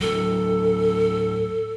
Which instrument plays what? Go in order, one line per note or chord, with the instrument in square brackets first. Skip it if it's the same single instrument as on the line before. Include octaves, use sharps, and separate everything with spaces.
[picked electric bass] A2 F#3 [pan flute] A4